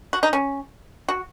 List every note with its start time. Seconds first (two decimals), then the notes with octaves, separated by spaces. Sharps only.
0.13 F#4
0.23 D#4
0.33 C#4
1.08 F#4